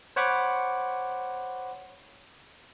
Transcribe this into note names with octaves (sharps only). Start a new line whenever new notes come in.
C5 C#5 F#5 B5 C#6 D6